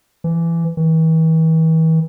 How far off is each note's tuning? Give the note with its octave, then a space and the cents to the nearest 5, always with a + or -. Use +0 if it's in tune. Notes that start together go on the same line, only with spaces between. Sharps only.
E3 +20
E3 -40